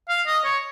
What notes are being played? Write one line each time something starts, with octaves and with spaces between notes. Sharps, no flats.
F5
D#5
C#5